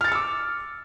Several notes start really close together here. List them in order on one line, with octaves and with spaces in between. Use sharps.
F6 A6 C#7 E6 D6